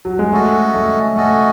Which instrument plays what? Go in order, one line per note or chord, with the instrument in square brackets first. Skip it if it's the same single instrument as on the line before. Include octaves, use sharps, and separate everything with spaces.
[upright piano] F#3
G#3
[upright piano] A3 [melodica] C#4 F#4 A4 D#5
[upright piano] A3
[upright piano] A3 [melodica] C#4 F#4 A4 D#5